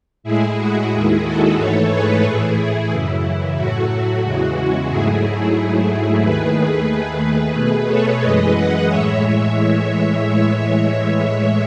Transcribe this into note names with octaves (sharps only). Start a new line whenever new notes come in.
A2 G#3 E4 G#4
F#4
D#2 D#3 G#3 E4 G#4
F#4 A4
G#2 E3 A3 A4 C#5
G#4 B4
A2 E3 A3 E4 G#4
E4
F#2 C#3 E3
A2 F#3 A3 F#4
E2 C#3 E3 G#3
G#2 F#3 A3 E4 G#4
G#2 F#3 A3
D#2 D#3 A3 G#4 B4
D#2 D#3 A3
G#4 B4
B2 A3
A4 C#5
F#2 E3 G#3 B4 D#5
D#5 F#5
A2 E3 G#3 C#5 E5
C#5 E5